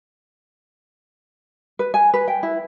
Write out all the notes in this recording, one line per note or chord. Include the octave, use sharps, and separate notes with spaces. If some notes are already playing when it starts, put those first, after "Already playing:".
B4
G#5
B4
G5
E4